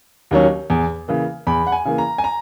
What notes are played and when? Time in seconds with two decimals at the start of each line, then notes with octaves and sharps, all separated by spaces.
0.31 D#2 D#3 F#3 C#4
0.70 E2
1.08 C#3 E3 A#3
1.47 E2 B5
1.67 F#5
1.72 G#5
1.85 C#3 E3 A#3
1.98 A#5
2.18 G#5
2.24 A#5